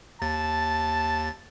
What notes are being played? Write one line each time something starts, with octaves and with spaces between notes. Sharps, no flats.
D#2 A5 A6